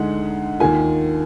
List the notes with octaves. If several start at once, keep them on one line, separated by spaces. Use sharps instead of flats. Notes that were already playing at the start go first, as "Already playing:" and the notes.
Already playing: D2 D3 G#3 D#4 F#5
D#2 D#3 A#3 F4 G#5